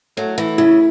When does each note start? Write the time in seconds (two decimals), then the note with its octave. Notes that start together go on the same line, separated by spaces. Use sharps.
0.17 F#3 A3
0.38 E3
0.58 C#3 E4